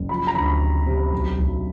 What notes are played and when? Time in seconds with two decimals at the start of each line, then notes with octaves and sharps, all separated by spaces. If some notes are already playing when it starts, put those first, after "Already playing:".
Already playing: F#1
0.09 F3 B5
0.27 A#5
0.35 D2 B5
0.61 C3
0.86 C3
1.13 B1
1.38 B1